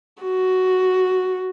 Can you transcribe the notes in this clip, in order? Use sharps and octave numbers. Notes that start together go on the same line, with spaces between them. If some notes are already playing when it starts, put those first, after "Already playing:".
F#4